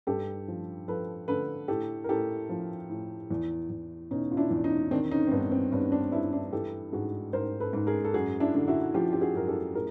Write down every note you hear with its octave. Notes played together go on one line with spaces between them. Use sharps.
G2 G4 A4
F3
F3 A4 B4
D3 A4 B4
A2 G4 A4
A#4
A2 G4 A4
F3
A2
E2
E2
B2 C#4 D#4
F4
D4 E4
E2
C#4 D#4
D#3 C4 D4
C#4 D#4
C4
G2 B3 C#4
C4
G2 B3 C#4
C4 D4
G2 D4 E4
D4 E4
E3 G4 A4
G#2 F#4 G#4
G#2 A#4 C5
A4 B4
G#2
G#4 A#4
A4
F#2 F#4 G#4
D4 E4
D3
E4 F#4
F3 F4 G4
G4
F#4 G#4
F#2 A#4
G4 A4
A2 G#4 A#4